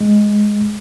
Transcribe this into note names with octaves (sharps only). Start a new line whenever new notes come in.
G#3